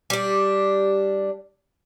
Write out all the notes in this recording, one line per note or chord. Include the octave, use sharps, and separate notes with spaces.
G3 D4